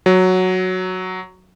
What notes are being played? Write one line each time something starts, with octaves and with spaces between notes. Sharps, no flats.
F#3